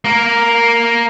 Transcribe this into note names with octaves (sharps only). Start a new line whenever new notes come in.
A#3 A#4